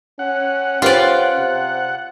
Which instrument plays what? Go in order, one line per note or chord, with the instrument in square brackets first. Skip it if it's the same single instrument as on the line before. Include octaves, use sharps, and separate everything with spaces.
[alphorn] C#4 [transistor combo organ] F#5
[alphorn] C#4 [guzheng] F4 D5 [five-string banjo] G4 B4 C5
[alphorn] C3